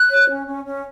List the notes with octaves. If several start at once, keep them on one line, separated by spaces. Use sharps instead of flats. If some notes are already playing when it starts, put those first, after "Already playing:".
Already playing: F#6
C#5
C#4
C#4
C#4